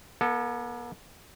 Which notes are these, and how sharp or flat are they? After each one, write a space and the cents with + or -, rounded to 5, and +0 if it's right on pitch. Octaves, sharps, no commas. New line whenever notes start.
B3 -45 A4 +10